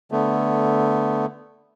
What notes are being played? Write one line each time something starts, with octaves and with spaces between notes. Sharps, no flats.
D3 A3 B3